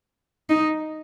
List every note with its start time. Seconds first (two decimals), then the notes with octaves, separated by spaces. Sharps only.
0.50 D#4